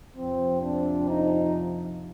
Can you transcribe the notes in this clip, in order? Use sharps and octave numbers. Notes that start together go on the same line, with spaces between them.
F2 C3 F3 C4
D4
D#4